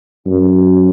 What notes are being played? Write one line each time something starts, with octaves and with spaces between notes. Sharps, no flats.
F#2